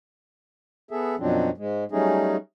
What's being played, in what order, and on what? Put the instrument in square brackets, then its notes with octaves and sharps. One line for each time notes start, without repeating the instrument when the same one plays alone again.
[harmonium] B3 G#4 A4 E5
F#2 B2 F3 F#3 C4 D4
G#2 G#3
F#3 G3 A3 C#4 D#4 G#4